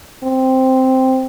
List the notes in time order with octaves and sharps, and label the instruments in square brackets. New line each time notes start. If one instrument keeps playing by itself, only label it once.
[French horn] C4